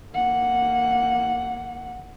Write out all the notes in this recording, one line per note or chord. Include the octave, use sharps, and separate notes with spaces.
A#3 F#5